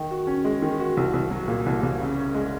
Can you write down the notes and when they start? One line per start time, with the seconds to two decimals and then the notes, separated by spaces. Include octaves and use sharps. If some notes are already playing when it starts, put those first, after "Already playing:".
Already playing: D#3
0.11 F#4
0.27 C#4
0.45 G#3
0.62 D#3
0.79 F#4
0.97 C2
1.14 C2
1.31 F#3
1.48 A#2
1.66 C2
1.83 C2
2.01 C#3
2.17 C#4
2.34 G#3